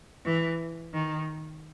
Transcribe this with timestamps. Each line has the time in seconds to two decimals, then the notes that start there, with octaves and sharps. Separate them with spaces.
0.25 E3
0.93 D#3